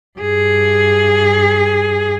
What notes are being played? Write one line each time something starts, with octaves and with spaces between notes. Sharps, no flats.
G2 G#4